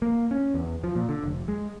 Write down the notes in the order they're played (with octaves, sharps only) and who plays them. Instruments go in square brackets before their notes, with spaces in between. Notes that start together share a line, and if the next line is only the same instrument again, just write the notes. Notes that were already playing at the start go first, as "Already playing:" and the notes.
[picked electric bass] A#3
C#4
E2
F3
A#2
D3
F1
G#3